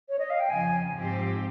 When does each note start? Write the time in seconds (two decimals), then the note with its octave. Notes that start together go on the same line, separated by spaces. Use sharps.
0.09 C#5
0.19 D#5
0.30 F5
0.40 G5
0.50 F2 C#3 F3 G#5
0.94 G#2 F3 C4 G4